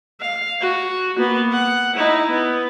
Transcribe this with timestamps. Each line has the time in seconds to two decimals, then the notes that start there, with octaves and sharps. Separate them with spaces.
0.21 F5
0.61 F#4
1.17 A#3 B3
1.52 F#5
1.96 D#4 E4
2.31 B3